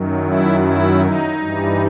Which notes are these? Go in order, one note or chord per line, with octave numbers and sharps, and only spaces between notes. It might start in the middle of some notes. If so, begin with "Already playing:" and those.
Already playing: F#2 D#3 F#3
E4
E4
D#4
G2 E3 G3